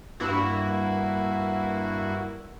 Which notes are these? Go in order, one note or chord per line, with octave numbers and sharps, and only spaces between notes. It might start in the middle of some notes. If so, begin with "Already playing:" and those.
G2 A#3 E4 F#4